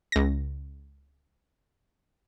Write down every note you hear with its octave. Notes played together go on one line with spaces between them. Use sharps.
C#2 A#6